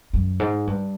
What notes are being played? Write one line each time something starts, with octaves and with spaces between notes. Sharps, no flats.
F#2
G#2
G2